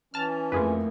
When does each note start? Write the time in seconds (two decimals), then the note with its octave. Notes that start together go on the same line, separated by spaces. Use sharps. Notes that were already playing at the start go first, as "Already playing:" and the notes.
0.14 E3 C#4 A5 F6
0.52 F2 A3 A#3 E4 F4 G#4 B4